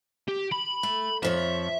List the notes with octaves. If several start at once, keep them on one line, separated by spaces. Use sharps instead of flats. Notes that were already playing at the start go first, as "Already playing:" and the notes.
G4
B5
A3
F2 F3 C#5 E5